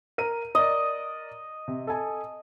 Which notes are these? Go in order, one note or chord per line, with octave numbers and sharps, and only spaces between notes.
A#4 D#7
A#4 D5 D#5
C3
A4 G#5